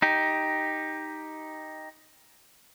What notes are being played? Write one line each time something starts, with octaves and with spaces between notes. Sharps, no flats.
D#4 G4